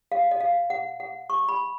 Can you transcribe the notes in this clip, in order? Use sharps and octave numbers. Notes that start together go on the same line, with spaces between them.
F5
D#5
F5
F#5
F#5
C#6
B5